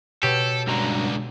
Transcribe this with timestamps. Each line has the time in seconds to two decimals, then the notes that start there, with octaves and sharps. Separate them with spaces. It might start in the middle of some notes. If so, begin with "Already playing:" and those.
0.23 B2 G4 A4 C#5 E7
0.67 C#2 G2 D3 F#4 A#5